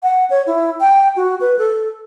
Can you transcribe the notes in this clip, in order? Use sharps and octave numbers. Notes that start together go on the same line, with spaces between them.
F#5
C#5
E4
G5
F#4
B4
A4